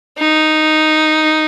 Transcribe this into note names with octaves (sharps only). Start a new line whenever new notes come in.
D#4